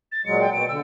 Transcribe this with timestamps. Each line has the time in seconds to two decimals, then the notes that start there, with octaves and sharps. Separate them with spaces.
0.12 A6
0.26 A#2 F#3 G#3 C#7
0.41 G5
0.53 B2 D7
0.69 D3 E6